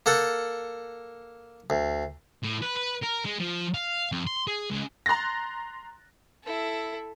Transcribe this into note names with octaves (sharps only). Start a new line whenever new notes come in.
A#3 A4 F#5
D2
A2
B4
B4
A#4
G#3
F3
F5
F2
C6
G#4
C#2
A#5 C6 F#6 A6 A#6
E4 A4